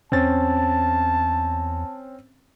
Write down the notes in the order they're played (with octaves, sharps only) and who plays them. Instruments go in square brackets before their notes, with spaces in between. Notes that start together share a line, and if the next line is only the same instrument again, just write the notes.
[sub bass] E2 [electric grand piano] C4 C#4 A6 [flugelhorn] A5